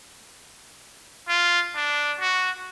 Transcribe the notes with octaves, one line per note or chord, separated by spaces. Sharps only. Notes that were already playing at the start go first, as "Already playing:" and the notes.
F4
D4
F#4